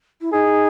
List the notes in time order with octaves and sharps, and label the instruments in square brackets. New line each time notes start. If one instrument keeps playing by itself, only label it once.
[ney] E4
[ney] D#4 [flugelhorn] G#4